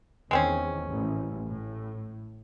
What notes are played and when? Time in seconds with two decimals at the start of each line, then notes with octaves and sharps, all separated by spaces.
0.31 E2 D#3 G#3 C4 C#4
0.86 A1
1.48 A2